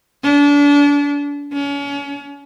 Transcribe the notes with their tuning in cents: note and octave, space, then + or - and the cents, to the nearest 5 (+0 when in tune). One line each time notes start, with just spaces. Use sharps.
D4 -35
C#4 +35